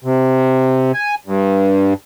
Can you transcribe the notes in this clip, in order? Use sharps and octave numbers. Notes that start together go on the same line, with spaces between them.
C3
G#5
G2